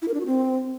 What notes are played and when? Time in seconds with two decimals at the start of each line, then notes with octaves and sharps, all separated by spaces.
0.02 E4
0.08 A#4
0.14 D4
0.20 F#4
0.26 C4